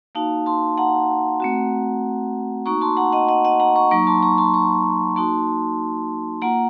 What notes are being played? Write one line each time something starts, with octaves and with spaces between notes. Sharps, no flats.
A#3 D#4 F#4 F5 A5
A5 C6
F#5 A#5
A3 C4 F#4
A#3 D#4 F#4 A#5 C#6
A5 C6
F#5 A#5
D#5 F#5
D#5 F#5
D#5 F#5
F#5 A#5
A#5 C#6
F#3 A#3 D#4 A#5 C#6
A5 C6
A#5 C#6
A5 C6
A#5 C#6
A#3 D#4 F#4 A5 C6
A#3 F4 F#5 A#5